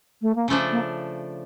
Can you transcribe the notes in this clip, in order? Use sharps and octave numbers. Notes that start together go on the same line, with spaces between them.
A3
A#3
C#3 F3 A3 C#4 D4
A#3